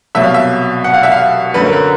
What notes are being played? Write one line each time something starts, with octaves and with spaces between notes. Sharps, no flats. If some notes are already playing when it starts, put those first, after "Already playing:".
C2 B2 F#3 E5
F5
E5
F#5
F5
E5
F5
F#2 D3 F#3 B4
A#4
B4